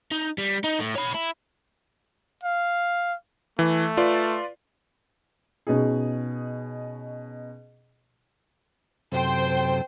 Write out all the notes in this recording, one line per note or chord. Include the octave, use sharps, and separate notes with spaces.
D#4
G3
D#4
A2
C#5 B5
E4
F5
E3 A3
F4 B4 D5
B2 C#4 D#4 G#4
F#2 C3 A4 C5 G5